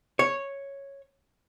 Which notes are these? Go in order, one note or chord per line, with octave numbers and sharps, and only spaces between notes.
C#5